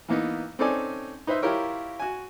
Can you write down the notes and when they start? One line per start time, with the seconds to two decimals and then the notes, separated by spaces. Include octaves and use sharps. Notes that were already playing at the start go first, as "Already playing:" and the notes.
0.09 E3 A#3 B3 D#4
0.59 C4 C#4 D#4 A4 D5 G#5
1.27 D#4 B4 C5 E5
1.42 E4 F4 G4 A#4 C#5
2.00 F#4 G#5